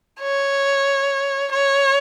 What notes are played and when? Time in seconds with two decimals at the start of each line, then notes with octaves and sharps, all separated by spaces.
0.21 C#5
1.52 C#5